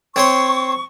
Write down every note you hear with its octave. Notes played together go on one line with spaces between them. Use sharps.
C4 C#5 C6 C#6